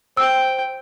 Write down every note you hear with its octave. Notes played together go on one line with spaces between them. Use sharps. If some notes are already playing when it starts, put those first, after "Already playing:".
C5 G5 E6